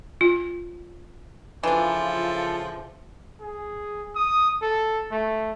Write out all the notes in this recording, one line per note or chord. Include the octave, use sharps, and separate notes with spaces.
F4
C#3 E3 F3 D4 F4 A4
G#4
D#6
A4
A3